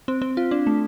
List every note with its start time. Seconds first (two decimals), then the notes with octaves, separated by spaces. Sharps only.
0.08 C4
0.22 C4
0.37 F4
0.51 D4
0.67 A3